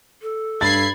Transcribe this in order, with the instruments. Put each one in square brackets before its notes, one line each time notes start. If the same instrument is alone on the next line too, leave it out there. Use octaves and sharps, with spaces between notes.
[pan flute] A4
[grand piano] G2 [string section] B5 G#6 C7 [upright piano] A6